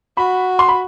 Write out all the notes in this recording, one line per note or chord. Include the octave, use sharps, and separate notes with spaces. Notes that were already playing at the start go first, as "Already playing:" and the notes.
F#4 B5
C6
B5